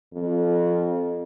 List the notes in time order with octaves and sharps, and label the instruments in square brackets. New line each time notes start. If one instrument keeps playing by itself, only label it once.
[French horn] F2